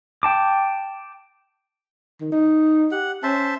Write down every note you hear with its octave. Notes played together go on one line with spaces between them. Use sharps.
G5 A5 D6
D#3
D#4
G4 F#5
C#4 C5 E5 A5